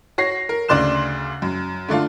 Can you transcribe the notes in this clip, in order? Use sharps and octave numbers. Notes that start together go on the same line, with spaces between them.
F#4 C#5 A#6 C7
A#4
D2 C#3 D5 C6 F#6 E7
F#2
D3 A3 D4 F4